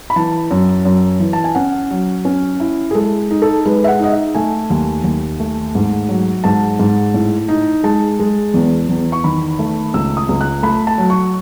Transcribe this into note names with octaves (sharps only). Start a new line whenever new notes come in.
B5
E3 A5
F#2
F#2
E3
A5
G#5
C#4 F#5
F#3
C#4
E4
G#4
G#3 A4
D#4
A4
G#3 B4
E5
F#5
D#4 D#5
E5
A3 G#5
D#2
D#2
A3
G#2
F#3
G#2 A5
G#2
A2
D#4
G#3 A5
G#3
E2
E2
C#6
D#3 B5
A3
C#2 E6
D#6
C#2
F#6
A3 B5
A5
F#3
C#6